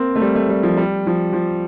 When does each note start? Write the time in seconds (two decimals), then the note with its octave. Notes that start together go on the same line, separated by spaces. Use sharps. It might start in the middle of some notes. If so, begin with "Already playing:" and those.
Already playing: A#3 C4
0.16 A3
0.21 G3
0.35 A3
0.49 G3
0.63 F3
0.77 G3
1.07 F3
1.33 F3